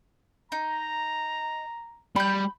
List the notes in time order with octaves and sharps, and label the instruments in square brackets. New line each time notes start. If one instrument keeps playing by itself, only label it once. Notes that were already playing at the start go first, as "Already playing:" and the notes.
[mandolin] D#4 [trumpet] A#5
[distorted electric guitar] G3 [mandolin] B5 G6